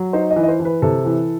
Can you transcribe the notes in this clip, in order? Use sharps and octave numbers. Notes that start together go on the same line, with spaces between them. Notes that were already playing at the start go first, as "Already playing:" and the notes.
Already playing: F#3
D#4 C5
D#5
E3
D#5
C5
E3
B4
C3 A4
E3